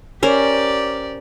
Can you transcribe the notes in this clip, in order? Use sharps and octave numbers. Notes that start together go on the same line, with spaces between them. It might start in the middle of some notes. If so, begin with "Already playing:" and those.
C#4 G4 A#4 C5 D5